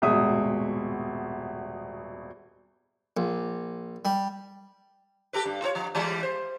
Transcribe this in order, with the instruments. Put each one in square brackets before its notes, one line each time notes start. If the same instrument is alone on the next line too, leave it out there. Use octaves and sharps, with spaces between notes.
[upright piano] D#1 G#1 B2 G#3 E5 D#6
[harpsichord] A#1
G3
[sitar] G4 A4 B4
G2
F4 A4 C#5
F3
E3 G3 G#3
C5